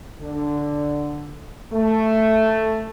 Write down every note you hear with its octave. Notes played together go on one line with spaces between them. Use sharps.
D3
A3